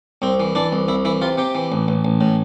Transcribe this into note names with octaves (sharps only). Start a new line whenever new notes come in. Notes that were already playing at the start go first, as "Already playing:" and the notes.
C2 C4
E3
E3 D4
C2
C2 E4
E3 E4
C3 F4
C3 G4
E3
A1
A1
A1
A2